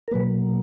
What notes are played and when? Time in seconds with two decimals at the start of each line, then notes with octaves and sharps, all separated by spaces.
0.08 A#4
0.11 B2 F#3 A#3 B4